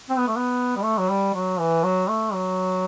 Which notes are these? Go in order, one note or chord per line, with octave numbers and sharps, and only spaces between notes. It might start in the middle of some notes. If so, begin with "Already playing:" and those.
C4
B3
A3
B3
G3
A3
F#3
G3
F#3
E3
F#3
A3
F#3